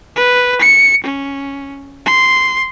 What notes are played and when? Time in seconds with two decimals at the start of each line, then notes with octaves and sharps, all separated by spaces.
0.16 B4
0.61 C#7
1.03 C#4
2.06 C6